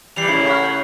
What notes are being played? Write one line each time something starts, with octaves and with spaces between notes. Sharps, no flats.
E3 G3 C7 F7
A2 C#3 F3 G#3 E4
C#5 F#5 F6 B6
G6